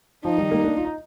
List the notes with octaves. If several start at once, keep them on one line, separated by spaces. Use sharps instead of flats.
F3 D#4
D#3 G3
G3 A#3
A#3 D4
F4
D#4